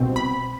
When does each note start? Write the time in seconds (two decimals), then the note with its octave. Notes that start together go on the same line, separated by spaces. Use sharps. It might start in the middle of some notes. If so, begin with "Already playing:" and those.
Already playing: C2 B2 C4
0.16 B5